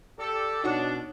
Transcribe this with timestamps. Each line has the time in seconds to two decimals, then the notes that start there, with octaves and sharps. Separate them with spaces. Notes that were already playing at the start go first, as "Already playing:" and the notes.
0.19 G4 A4 D5 D6
0.64 B2 D4 D#4 F#4 C#5